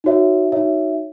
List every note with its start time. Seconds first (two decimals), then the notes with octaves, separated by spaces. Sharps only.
0.04 D#4 F#4 C#5 E5
0.52 D#4 F#4 C#5 E5